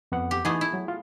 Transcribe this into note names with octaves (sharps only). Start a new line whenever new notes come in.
F2 B3 F#5
G4
E3 A3 B3 D#4 G#4
E4
F#3
F4